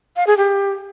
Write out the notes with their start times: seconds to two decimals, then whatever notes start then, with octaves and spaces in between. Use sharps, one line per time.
0.16 F5
0.27 G#4
0.37 G4